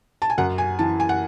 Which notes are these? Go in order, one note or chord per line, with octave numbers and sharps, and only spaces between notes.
A5
G#5
F#2 F#5
G#5
E3 A5
G#5
F#5